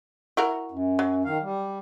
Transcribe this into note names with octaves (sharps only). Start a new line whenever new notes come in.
E4 F#4 A#4
F#2
F#3
D#3 F5
G3